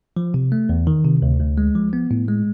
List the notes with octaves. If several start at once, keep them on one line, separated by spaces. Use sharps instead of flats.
F3
C3
A3
E2
D#3
C3
D2
D2
G#3
F3
B3
A2
G#3